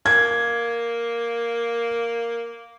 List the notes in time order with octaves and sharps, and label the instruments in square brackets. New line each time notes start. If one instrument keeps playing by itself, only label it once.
[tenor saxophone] A#3 [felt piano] G#6